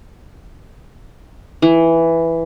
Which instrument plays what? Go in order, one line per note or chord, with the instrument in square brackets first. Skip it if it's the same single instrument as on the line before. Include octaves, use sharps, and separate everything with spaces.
[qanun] E3